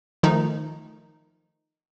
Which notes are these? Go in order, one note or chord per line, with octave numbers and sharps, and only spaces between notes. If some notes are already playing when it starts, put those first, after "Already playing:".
D#3 F3 A3 D#4